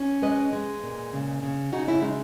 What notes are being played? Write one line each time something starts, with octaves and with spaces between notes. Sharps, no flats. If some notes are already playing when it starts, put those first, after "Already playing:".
Already playing: C#4
G#3 B4 D#5
G#3
A#2
C#3
C#3
C#3 D#4 F#4
C#4 E4
G#3 D#4